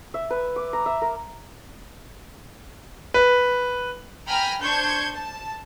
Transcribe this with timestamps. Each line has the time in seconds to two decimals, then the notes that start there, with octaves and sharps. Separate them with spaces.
0.14 E5
0.30 B4
0.56 D6
0.73 A#5
0.86 E5
1.02 A#4
3.14 B4
4.27 G5 G#5 A#5 B5 F6
4.61 D4 C5 C#6 G6 G#6
5.14 A5